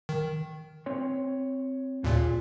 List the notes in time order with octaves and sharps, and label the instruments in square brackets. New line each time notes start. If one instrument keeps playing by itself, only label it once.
[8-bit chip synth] D#3
[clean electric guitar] C4 C#5 C6
[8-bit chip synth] D#2 A#2 [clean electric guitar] F4 G#4